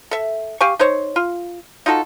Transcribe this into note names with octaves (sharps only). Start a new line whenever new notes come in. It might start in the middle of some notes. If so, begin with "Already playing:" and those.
A4 E5
G4 F5 G#5 C#6
D#4 C5 C#5
F4
D#4 F4 F#4 A4